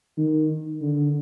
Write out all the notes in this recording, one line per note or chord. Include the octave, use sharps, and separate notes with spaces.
D#3
D3